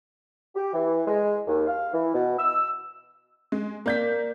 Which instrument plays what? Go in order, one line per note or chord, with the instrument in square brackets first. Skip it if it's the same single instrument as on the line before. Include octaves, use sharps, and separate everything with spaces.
[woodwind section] G4
E3
G#3
D#2
F5
E3
B2
E6
[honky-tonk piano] G#3
[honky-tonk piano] A#3 G6 B6 [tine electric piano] A#4 D5